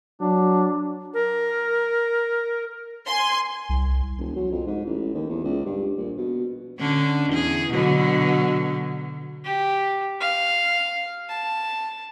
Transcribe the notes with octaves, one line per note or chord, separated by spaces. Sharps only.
F#3 D4
A#4
G#5 C6
C2
E1
F#3
F2
G#2
A1
D#2
E2
C#2
G2
A#1
B2
D3 C#4 D4
E2 G#4
B2 D3 F#3
G4
F5
A5